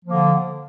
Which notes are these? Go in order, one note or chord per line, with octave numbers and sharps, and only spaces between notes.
D3 F3 A#3